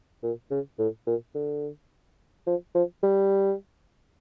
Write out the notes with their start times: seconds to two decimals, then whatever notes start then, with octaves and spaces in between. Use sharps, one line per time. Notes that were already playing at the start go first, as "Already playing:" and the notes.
0.23 A#2
0.51 C#3
0.79 A2
1.07 A#2
1.35 D3
2.47 F3
2.75 F3
3.03 G3